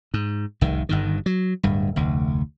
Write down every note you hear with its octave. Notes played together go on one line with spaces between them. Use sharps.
G#2
F1 C2 D#3
G1 G2 D#3
F#3
D1 G2
F1 D2